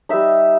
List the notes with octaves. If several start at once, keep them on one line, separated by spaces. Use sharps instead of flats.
G3 D#4 E5